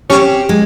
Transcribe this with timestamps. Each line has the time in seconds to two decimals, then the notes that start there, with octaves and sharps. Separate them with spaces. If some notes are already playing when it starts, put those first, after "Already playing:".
0.10 C4 C#4 G4
0.49 G#3